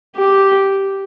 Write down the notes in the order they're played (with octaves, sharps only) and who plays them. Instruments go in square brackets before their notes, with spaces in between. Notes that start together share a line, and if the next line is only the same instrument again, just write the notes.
[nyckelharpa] G4